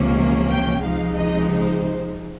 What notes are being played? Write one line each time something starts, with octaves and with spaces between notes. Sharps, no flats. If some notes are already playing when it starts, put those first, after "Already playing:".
Already playing: C#2 C3 F3 A#3 C#4
G5
C#2 C3 F3 G#3 D#4 F5
D#5
C5